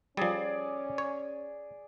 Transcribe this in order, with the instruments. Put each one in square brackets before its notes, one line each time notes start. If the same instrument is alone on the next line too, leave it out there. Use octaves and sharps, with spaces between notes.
[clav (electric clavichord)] F3 G3 [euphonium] C#4 [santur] G#4 D5
[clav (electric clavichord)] C#5